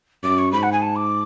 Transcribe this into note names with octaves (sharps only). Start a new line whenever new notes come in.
F#2 D6
C#6
G#2 B5
F#5
G#5
A5
D6